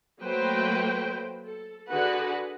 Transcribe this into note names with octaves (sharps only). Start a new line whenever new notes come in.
F#3 A3 A#3 B4 C5 G5
A4
D3 F#4 G#4 B4 F#5